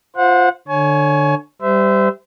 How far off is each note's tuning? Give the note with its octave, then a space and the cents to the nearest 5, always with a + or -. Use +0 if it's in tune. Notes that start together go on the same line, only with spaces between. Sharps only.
F4 +0 C5 +0 F#5 -25
D3 +15 C#5 +0 G#5 +30
G3 +0 C5 -35 E5 +0